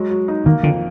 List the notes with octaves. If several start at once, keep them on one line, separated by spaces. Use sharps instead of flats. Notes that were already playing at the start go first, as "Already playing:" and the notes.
Already playing: F#3 G#3
F#3
D#4
D#3 A#3
F2 D3